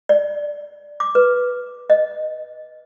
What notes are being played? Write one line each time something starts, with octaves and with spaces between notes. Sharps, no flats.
D5
D6
B4
D#5